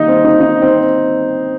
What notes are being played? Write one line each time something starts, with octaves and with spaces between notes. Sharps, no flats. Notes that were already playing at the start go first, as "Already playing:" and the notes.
Already playing: D#3 G3 A#3 D#4 D#5
C4
D#4
D#4
C4